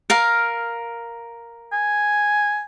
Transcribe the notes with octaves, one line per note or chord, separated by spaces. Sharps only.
A#4 F5
G#5